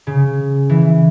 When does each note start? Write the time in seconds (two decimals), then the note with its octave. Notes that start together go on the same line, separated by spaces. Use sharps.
0.07 C#3
0.69 E3